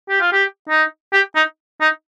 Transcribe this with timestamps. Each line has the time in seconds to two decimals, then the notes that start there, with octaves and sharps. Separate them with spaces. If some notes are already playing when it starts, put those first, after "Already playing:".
0.10 G4
0.21 F4
0.32 G4
0.69 D#4
1.13 G4
1.35 D#4
1.81 D#4